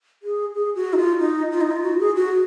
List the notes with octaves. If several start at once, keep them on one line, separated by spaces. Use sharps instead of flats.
G#4
G#4
F#4
D#4
F4
D#4
F4
D#4
F4
F#4
G#4
F#4